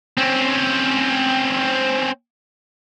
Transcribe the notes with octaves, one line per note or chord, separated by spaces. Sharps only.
C4 C#4